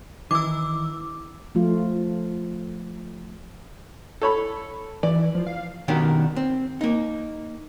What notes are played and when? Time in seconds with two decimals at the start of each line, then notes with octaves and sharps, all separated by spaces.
0.31 D#3 E3 D6 E6
1.55 F3 A3 F4
4.22 A4 C#5 B5
5.03 E3 D5
5.35 F3
5.47 F5
5.88 B2 D#3 D4 G4 A#4
6.36 C4
6.81 A#3 D#4